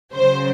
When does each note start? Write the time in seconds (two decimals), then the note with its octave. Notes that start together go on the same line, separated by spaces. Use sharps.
0.13 C#3 F#3 C5